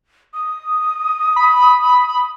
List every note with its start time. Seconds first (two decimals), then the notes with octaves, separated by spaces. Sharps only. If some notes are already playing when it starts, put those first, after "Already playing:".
0.34 D#6
1.36 B5